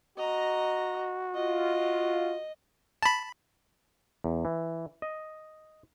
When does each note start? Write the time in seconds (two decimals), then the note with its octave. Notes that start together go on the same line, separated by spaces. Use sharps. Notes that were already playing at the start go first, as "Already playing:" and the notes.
0.18 F#4 D#5 A#5
1.35 F4 D#5
3.03 A5 B5
4.24 E2
4.45 E3
5.02 D#5